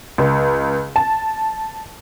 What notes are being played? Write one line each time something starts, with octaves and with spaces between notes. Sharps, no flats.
C#2
A5